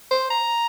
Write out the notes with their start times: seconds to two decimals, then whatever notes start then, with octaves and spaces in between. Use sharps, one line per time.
0.11 C5
0.30 A#5